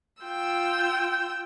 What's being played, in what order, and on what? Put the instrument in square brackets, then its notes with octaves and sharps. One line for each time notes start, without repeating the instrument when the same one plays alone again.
[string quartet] F4 G5 E6